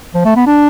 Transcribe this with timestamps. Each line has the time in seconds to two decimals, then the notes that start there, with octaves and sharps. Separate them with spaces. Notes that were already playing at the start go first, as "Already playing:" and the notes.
0.14 F3
0.25 A3
0.36 B3
0.47 D4